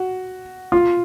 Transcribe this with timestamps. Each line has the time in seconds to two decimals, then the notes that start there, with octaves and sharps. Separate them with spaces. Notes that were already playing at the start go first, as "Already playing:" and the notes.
Already playing: F#4
0.72 F4